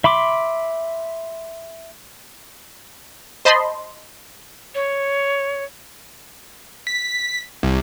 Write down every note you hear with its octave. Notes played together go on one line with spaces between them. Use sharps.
E5 B5 C6 D6
C5 D#5 A5 B5 C6
C#5
B6
C2